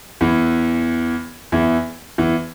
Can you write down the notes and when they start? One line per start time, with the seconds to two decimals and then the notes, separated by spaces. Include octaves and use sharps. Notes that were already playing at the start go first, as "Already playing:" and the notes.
0.21 E2 E3
1.52 E2 E3
2.18 E2 E3